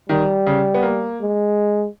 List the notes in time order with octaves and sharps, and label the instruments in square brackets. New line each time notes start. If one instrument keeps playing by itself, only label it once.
[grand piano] D#3 [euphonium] G3
[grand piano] C#3
B3
A#3
[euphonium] G#3